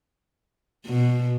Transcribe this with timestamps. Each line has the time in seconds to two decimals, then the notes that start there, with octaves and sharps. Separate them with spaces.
0.86 B2